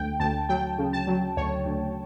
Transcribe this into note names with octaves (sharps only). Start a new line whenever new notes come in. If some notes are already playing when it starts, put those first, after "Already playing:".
Already playing: D2 G5
D2 A5
F#3 G5
C#3
A5
F#3
D2 C#5
D2